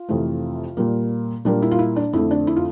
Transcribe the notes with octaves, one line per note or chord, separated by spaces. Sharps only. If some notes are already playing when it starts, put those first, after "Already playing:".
Already playing: F4
F2 C3 E3 A3
A#2 G3 A#3
A#2 G3 A#3 D4
E4
F4
E4
D4
F2 D3 A3 E4
D4
E4
F4